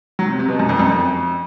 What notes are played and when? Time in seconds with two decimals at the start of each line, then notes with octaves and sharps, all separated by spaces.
0.19 F#3
0.29 C3
0.39 C3
0.49 B2
0.59 F#2
0.69 F2
0.79 F#2
0.90 F2